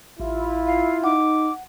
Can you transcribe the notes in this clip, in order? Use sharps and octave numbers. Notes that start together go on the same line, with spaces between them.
A1 E4 F4
F5
D#4 F#5 D6